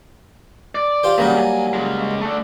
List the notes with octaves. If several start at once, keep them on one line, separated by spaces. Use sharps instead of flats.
D5
F4 G4 C5
C#3 F#3 G3 A#3
D#2 G#5
C#3 G#3
A3 D4